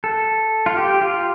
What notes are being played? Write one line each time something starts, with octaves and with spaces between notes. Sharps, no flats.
A4
F4
G4
F4